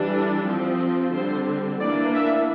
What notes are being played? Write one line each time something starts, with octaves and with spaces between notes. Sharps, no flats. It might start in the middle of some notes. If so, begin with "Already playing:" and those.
Already playing: E3 G3 D4
A4
F3 C4
D3 G3 C4 C5
E3 A#3 D4 D5
E5